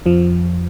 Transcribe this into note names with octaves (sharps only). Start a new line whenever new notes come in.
F2 F3